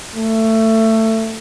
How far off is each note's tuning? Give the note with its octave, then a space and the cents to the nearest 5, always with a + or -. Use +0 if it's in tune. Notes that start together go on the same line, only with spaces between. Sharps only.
A3 +20